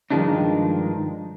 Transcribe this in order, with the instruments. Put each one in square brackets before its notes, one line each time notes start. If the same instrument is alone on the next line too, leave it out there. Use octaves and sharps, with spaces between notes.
[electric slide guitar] G2 D#3 F3 G#3 D4 D#4